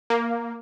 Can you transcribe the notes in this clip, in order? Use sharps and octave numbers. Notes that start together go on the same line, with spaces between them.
A#3